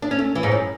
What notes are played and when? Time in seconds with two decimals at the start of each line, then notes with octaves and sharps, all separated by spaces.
0.02 D4
0.11 C#4
0.19 A3
0.35 E3
0.43 G#2
0.52 F#2